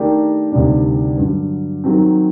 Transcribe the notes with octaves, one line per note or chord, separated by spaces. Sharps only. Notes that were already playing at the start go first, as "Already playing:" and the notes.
Already playing: D#3 A3 D4 G4 A#4
D2 C3 D#3 G3 D4
G2 D3 F#3
D#3 F#3 C4